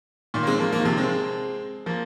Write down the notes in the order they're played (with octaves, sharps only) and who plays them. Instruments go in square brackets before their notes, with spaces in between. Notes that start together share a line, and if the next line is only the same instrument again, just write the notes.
[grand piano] A#2 D#3
A#3
G#3 C4
F3 A#3
F3 A#3
D#3
C3 F3
G#3 C4
F3 A#3